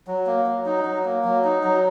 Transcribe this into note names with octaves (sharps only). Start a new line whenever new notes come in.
F#3
A#3
F#3
D#4
F#3
A#3
F#3
D#4
F#3